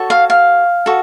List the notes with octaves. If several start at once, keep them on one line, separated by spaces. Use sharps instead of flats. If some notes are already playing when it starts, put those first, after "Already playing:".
Already playing: F#4 A4 C#5
F5
F5
F#4 A4